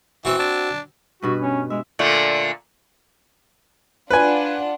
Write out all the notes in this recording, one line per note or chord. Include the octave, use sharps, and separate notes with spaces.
E3 C4 F#4
D4
G2 B2 F#4 B4
C#4
G#3 E5
A#2 D3 A3
D4 F4 B4 F#5 G#5